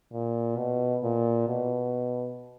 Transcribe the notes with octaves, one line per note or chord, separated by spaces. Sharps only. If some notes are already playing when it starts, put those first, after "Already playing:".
A#2
B2
A#2
B2